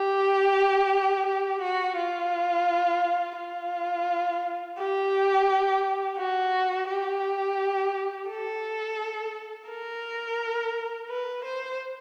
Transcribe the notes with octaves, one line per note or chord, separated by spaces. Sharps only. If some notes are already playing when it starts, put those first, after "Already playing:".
Already playing: G4
G4
F#4
F4
F4
G4
F#4
G4
A4
A#4
B4
C5